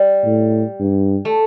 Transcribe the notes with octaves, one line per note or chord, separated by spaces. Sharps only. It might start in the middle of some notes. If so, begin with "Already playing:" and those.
Already playing: G3
A2
G2
A3